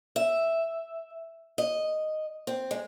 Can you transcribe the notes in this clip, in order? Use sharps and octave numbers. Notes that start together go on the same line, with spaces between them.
E5
D#5
C4
G#3